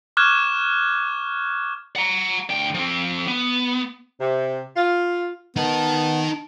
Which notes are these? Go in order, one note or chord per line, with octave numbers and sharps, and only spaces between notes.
C#6 D6 F6 F#6 G#6 E7
F#5 A#5
D2 G5
F3 C4
B3
C3
F4
B3 D#4 A#4 A5